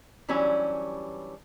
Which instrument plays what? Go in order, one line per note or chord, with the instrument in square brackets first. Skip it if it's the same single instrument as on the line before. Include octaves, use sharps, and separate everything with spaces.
[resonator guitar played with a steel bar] E3 F#3 G3 C#4 D4